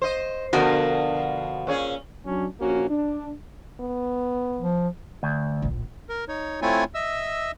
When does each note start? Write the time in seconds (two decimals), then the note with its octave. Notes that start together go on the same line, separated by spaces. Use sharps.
0.02 C5 D#5
0.53 B2 D3 F3 F#4 A#4
1.67 A#2 C#4 G#4
2.26 F#3 C#4 D4
2.60 A#1 A#3 C#4 F#4
2.89 D4
3.80 B3
4.59 F3
5.23 D2
5.62 D1 A#1
6.09 A#4
6.28 D#4 C#5
6.62 A3 C4 E4 F4 C#5 G#5
6.94 D#5 E5 E6